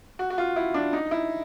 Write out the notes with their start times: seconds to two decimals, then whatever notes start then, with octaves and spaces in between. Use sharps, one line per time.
0.19 F#4
0.30 F#4
0.38 F4
0.56 E4
0.74 D4
0.93 D#4
1.11 E4